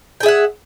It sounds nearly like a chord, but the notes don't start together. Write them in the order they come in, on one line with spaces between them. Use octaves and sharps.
G5 G#4 E5 F#5